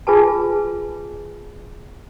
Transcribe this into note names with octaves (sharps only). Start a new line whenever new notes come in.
F4 G#4 B4 G#5 A5